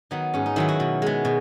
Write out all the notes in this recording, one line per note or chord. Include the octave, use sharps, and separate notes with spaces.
D#3 F#3 B3 D#4
G#2 C#4
D#4
D#3 F#3 B3 E4
F#4
B2
G#3 B3
B2